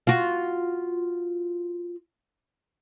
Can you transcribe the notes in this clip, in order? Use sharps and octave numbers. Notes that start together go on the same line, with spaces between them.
F4 F#4